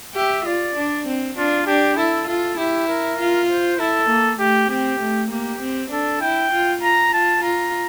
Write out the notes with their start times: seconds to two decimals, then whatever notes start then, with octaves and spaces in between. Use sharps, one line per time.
0.15 G4 E5
0.46 F4 D5
0.76 D4
1.07 C4
1.37 D4 F4
1.67 D4 G4
1.97 E4 A4
2.28 F4 A4
2.57 E4 G4
2.88 A#4
3.19 F4
3.49 C5
3.79 E4 A4
4.10 A#3
4.39 A3 G4
4.70 C4 G4
5.01 A3
5.31 A#3 G4
5.61 C4
5.91 D4 A4
6.21 E4 G5
6.52 F4
6.82 F4 A#5
7.12 F4 A5
7.42 F4 A#5